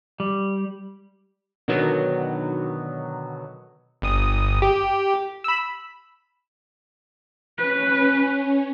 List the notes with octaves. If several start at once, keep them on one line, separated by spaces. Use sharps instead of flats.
G3
B2 D3 D#3 F#3 B3
G1 D#6
G4
B5 E6
C#4 B4